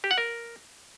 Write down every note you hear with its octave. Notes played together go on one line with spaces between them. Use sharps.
G4
F#5
A#4